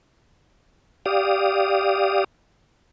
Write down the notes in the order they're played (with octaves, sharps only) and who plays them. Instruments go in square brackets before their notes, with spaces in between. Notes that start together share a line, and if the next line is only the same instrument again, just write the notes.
[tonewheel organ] G4 D5 F5 D#6